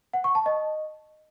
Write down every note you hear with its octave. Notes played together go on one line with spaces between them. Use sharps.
F#5
C#6
A5
D#5